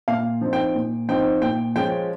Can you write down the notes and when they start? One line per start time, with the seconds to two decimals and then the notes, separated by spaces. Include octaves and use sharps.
0.08 A#2 F5
0.41 F3 C4 D#4
0.53 G5
0.75 A#2
1.09 F3 C4 D#4 G5
1.42 A#2 G5
1.76 F3 G#3 C#4 G5